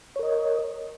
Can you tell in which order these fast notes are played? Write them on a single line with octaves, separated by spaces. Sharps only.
C#5 A#4 D#5